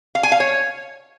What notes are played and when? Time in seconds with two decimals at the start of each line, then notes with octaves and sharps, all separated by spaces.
0.15 F5
0.23 G#5
0.32 F5
0.40 C#5